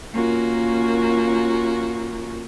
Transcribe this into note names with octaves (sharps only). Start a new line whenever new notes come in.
A#3 C#4 F4 F#4 A#4